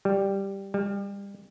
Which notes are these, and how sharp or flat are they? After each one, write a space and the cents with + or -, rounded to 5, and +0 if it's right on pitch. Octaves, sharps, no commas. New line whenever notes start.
G3 +0
G3 +30